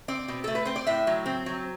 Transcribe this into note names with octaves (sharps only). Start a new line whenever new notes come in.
C4 D5
B2
A3 A4
B4
C4 C5
D5
A2 E5
F#3
C4
F#3